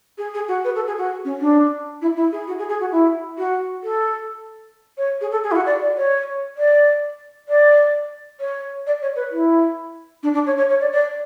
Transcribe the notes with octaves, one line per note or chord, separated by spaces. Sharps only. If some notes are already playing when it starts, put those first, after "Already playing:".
G#4
G#4
F#4
B4
A4
G#4
F#4
C#4
D4
E4
E4
G#4
F#4
G#4
G#4
F#4
E4
F#4
A4
C#5
G#4
A4
G#4
E4
F#4
D5
D5
C#5
D5
D5
C#5
D5
C#5
B4
E4
D4
D4
C#5
C#5
C#5
D5
D5